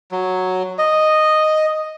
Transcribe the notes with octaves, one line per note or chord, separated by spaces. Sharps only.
F#3
D#5